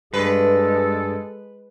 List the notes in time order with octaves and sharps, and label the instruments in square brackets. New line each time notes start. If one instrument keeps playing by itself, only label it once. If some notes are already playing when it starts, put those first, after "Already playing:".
[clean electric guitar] G2 [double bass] G#3 [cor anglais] A4 [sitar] B4